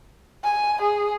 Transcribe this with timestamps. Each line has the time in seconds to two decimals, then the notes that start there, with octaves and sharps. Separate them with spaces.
0.44 G#5
0.82 G#4